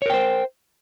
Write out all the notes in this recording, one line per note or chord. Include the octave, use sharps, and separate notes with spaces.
A#4 C5 C#5 G5